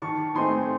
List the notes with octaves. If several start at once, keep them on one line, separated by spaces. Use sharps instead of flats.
D#3 A5 C#6
A3 C4 D#4 G#5 C6